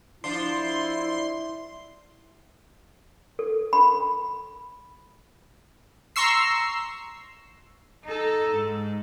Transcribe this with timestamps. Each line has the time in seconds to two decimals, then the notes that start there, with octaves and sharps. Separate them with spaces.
0.24 F3 D4 E4 C6
3.39 A4
3.73 B5
6.16 A#5 C6 C#6 E6 C7
8.04 D#4 A4
8.53 G#2